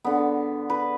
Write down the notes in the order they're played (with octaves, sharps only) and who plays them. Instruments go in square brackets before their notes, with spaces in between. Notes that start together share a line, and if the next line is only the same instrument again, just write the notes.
[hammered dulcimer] D3 B3
B4